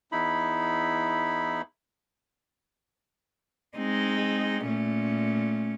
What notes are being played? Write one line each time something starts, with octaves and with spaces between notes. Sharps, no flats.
E2 D#4 E4 B5
G#3 C4 D#4
A#2 A3 C#4